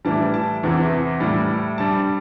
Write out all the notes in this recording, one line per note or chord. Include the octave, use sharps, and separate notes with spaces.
A2 E3 G3 A5
A5
E2 C3 E3
A2 G3
G2 G3 A5